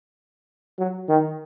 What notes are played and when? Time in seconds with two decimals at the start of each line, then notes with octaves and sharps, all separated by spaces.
0.78 F#3
1.09 D#3